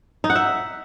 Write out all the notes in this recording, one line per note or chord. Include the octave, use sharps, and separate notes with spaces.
D#4
F#5
E5